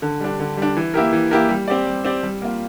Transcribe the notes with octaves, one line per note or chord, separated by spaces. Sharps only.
D3
G3 D4
D3
G3 D4
E3
A#3 E4 G4 A#4
E3
A#3 E4 G4 A#4
G3
C4 G4 D5
G3
C4 G4 D5
G3
A#3 F4